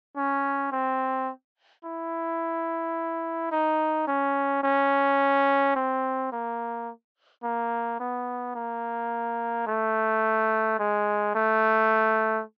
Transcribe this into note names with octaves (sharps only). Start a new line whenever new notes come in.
C#4
C4
E4
D#4
C#4
C#4
C4
A#3
A#3
B3
A#3
A3
G#3
A3